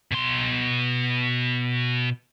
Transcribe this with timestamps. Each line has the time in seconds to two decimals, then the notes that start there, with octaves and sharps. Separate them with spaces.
0.12 B2 C6